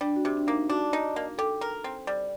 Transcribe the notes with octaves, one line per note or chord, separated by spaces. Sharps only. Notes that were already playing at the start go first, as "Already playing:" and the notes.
G3 D4
F#4
C3 G4
D4
A#3 D#4
D4 F#4
D#4
A#3
G4 A4
A#4
C4
G3